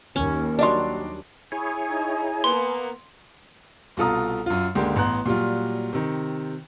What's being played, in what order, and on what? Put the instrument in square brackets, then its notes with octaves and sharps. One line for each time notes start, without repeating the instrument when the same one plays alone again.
[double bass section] D#2 [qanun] C#4
[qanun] F#3 G3 D4 [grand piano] D5 D#5 C6
[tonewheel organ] E4 G#4 C#5 [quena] G#5
[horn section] D#4
[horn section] A#3 B3 [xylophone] C6
[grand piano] C2 B2 F4 A4 A#5 D#6
F#2 F4
C#2 D3 A#3 G4
A1 B3 A#5 C6 F#6
A#2 F#3 G3 F4
C3 D#3